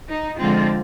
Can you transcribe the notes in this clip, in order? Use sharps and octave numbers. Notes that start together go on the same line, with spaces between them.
D#4
D3 F3 G#3 C4 F4